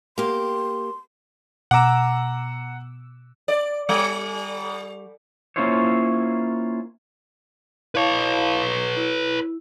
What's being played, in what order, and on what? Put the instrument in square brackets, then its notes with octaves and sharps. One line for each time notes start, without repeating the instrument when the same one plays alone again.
[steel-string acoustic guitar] A#3 G4 [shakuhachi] C6
[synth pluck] B2 D6 E6 [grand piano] F#5 A#5
[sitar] D5
G3
[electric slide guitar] A#3 C#4 E4 F4 C5 C#5
[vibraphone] E4 F5 A5 [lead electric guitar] B4 C#5
[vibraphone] E4